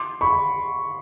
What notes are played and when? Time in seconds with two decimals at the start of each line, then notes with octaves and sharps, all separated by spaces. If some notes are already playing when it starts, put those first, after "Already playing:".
Already playing: C6 D6
0.21 B5 C#6